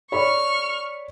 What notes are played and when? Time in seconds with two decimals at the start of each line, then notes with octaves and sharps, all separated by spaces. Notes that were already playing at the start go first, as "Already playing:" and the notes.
0.12 C#5 D5 B5 C#6 F6